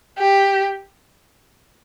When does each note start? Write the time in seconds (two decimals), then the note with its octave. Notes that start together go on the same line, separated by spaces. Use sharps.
0.19 G4